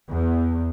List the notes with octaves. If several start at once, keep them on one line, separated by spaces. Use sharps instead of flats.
E2